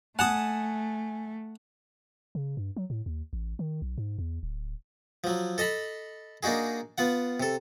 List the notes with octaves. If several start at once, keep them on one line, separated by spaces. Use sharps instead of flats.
A3 F#5 G#5 A5 D#6
C#3
G2
F#3
A2
D#2
A1
D#3
B1
G#2
E2
D1
F3 F#3
A4 D#5 A5 B5
A#3 D4 D#4 F#4 G#4
B3 F4 F#5
C3 A4